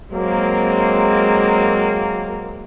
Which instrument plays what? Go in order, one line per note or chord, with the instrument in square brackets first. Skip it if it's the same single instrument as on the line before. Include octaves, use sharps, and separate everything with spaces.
[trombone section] F#3 A#3 [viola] G#3 C4